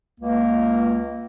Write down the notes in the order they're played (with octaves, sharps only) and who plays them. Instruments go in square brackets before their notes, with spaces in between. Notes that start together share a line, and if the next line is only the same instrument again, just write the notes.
[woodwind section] C#2 A#3